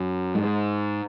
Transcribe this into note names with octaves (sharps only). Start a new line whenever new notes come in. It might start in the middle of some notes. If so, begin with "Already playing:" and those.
Already playing: F#2
G#2